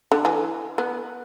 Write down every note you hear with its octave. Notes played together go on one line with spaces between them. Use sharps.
D3
E3
B3